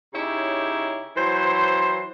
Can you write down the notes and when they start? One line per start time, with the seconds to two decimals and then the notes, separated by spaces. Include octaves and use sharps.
0.14 C#3 D#4 E4 G4 C#5
1.17 E3 F#3 C5